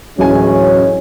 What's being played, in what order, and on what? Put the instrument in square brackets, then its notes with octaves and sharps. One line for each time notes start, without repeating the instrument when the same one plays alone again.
[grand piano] D1 E3 G#5 [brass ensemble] G#3 C#4